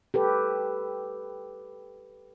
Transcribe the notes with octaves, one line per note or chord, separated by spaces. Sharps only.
G4 A4 B4